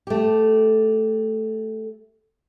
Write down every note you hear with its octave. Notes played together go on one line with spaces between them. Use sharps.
A3 G4